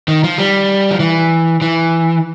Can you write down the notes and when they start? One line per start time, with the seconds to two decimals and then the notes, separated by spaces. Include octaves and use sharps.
0.08 D#3
0.24 F3
0.38 G3
0.91 F3
1.00 E3
1.62 E3